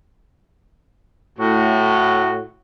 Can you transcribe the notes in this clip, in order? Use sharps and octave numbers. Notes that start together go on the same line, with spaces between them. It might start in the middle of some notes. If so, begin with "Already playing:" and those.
A2 F#4